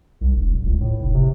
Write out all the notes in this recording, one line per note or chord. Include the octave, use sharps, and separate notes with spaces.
C2
E1
D1
C#2
A2
F1
C3